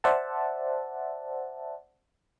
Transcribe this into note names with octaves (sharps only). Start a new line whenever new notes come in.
C5 D5 E5 F#5 A5